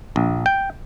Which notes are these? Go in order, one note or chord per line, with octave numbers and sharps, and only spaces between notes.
A#1
G5